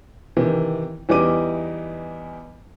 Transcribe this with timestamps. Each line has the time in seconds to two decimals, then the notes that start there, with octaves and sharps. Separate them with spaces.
0.37 C3 D#3 E3
1.09 E2 E3 G3 D#4 D6 D#7